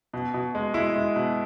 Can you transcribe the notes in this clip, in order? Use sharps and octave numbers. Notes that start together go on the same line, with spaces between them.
B2
B2
G#3
G#3 E4
G#3
B2